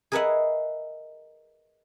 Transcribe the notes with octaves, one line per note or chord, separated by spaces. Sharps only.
G#4 A#4 B4 D#5 E5 F#5